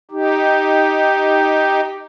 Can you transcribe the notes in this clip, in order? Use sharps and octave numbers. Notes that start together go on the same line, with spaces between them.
D#4 G4